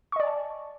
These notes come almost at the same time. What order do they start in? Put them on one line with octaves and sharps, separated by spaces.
C#6 D#5 D5 G#5 A5